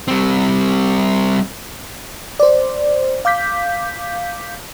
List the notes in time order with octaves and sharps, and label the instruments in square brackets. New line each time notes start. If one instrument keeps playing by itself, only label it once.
[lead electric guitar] G3 C4
[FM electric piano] C5 D5
F5 D6 G6 B6